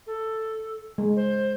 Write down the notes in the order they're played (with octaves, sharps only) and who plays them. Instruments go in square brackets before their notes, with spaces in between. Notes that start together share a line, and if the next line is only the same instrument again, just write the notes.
[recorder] A4
[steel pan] G#3
[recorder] C5